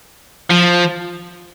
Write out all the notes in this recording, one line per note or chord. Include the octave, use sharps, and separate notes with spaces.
F3